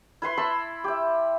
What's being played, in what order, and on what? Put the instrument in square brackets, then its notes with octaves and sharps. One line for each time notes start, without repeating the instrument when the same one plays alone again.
[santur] E4 B4 C6
A5 B5 C6 E6
G4 E5